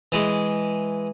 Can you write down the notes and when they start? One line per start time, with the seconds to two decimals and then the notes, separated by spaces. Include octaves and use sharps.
0.12 E3 G#3